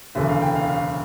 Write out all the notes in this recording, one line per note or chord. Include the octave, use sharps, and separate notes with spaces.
E1 D2 C#3 E3 E5
F5
G5
F5
F5